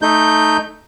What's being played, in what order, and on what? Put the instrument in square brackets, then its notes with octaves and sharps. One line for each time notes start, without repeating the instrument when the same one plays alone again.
[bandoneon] A3 D#4 G6